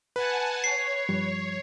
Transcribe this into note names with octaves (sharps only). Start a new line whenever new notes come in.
B4 F#5 G#5 A5
C#5 C7
G2 F3 G3